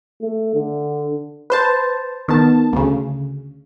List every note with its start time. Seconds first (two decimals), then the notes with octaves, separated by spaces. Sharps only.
0.22 A3
0.55 D3
1.50 B4 C5 A5
2.28 D#3 B3 A5
2.73 D2 C#3